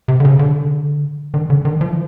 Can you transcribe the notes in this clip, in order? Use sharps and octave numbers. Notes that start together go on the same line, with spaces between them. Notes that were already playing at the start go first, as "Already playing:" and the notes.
C3
D3
C#3
D3
D#3
D3
D#3
F3